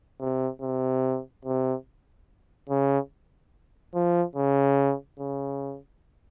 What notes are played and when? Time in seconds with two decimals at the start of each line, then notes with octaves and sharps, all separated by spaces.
0.20 C3
0.62 C3
1.45 C3
2.70 C#3
3.95 F3
4.36 C#3
5.19 C#3